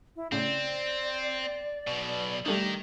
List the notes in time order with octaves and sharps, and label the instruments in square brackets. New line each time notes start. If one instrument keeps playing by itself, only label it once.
[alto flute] E4
[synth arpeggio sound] A2 C#3 [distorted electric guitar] C4 [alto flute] D5
[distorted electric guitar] B1 B2
[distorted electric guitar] D#3 [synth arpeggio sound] G3 A3 D4 [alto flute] G4